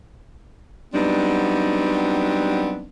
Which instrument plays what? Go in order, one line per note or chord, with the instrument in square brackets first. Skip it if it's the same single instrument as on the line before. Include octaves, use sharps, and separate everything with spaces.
[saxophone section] F#3 G3 B3 C4 D4 D#4